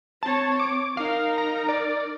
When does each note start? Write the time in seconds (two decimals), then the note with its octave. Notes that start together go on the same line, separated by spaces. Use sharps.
0.23 C4 C#5 A5
0.60 D6
0.97 D#4 A#4 F5
1.38 A#5
1.69 D5